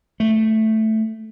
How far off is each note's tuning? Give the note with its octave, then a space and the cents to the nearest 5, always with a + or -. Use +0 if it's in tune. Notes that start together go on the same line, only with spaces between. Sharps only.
A3 +0